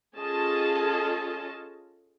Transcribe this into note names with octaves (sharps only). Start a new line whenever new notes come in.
C#4 F4 G#4 A4 D#5 A5